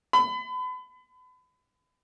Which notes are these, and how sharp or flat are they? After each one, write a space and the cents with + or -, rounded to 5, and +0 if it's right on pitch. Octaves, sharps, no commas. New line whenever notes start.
B5 +35